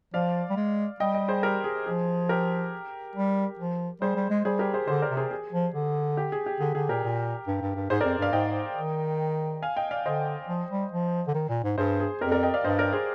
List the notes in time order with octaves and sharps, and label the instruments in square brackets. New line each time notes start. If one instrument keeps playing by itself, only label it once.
[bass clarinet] F3 [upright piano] D5 F5
[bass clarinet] G3
G#3
[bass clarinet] G3 [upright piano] D#5 G5
[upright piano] D#5 G5
G#4 C5
G4 A#4
G#4
[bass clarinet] F3 [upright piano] G#4
[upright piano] G4 A#4
[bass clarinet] G3
F3
[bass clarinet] G3 [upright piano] G#4 C5
[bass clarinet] G3
G#3
[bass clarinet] G3 [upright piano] G#4 C5
[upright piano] G4 A#4
G#4 C5
[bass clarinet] D3 [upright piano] G#4 C5
[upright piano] A#4 D5
[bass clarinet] C3
[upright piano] G#4 C5
G#4
[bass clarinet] F3
D3
[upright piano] G4
G#4
G4
[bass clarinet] D3 [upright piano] G#4
[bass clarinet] D3 [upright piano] G#4
[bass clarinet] A#2 [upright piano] G4 A#4
[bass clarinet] A#2
G2
G2
G2
[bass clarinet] G#2 [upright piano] G#4 C5
[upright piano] A#4 D5
[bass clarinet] F2
[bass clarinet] G2 [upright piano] D5 F5
[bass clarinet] G#2 [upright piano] D#5 G5
[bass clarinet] D#3
[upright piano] F5 G#5
D#5 G5
D5 F5
[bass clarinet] D3 [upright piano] C5 D#5
[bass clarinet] F3
G3
F3
D3
D#3
A#2
G#2
[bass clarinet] G2 [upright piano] G#4 C5
[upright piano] G#4
[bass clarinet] F2 [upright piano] G4 A#4
[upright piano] A#4 D5
D#5 G5
D5 F5
[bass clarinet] G2 [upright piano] C5 D#5
[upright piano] A#4 D5
G#4 C5